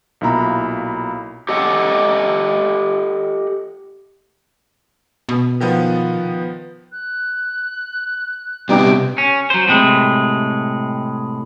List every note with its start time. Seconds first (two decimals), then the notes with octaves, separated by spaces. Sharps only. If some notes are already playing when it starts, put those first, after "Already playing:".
0.21 B1 A#2 E4 A#5 B5
1.49 G4 A4 D#5 F#5
5.29 B2
5.60 D#3 F3 B3
6.92 F#6
8.69 C3 G3 B3 D#4 G4 D7
9.18 C#4
9.50 F#3 C5
9.68 A2 C3 G#3